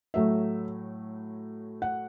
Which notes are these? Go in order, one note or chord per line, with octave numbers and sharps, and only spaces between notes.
A2 F#3 A3 E5
F#5